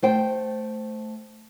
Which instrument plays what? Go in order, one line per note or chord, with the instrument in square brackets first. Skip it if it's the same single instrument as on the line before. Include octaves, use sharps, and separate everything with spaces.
[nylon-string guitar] A3 C5 G5